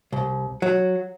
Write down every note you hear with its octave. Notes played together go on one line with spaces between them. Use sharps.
C2
F#3